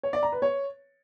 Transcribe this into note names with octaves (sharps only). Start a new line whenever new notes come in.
C#5
D5
A#5
B4
C#5